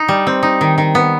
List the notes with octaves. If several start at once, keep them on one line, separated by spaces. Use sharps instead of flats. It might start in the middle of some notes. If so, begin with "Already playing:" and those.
Already playing: D#4
G3
C4
D#4
D#3
D#3
B3